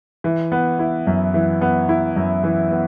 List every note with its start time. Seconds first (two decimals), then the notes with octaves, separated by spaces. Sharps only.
0.24 E3
0.52 B3
0.79 E4
1.07 F#2
1.34 E3
1.61 B3
1.89 E4
2.16 F#2
2.44 E3
2.71 B3